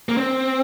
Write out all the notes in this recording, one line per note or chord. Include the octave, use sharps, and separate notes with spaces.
A#3
C4